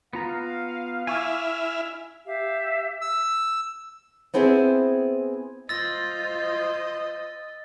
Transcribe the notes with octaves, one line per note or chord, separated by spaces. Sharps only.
B3 F4 F5 A#5
E4 E5 G#5 C#6 D6 F6
G4 E5 F5
E6
B3 C4 E4 G#4 C5 E5
F4 C5 D#5 E6 A6 A#6